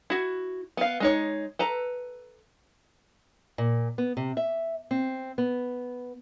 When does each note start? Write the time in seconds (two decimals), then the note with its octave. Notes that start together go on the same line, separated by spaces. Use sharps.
0.10 E4 F#4
0.77 B3 F5
1.00 G#3 D#4 C#5
1.59 A4 B4 A#5
3.58 A#2
3.98 B3
4.17 C3
4.37 E5
4.91 C4
5.38 B3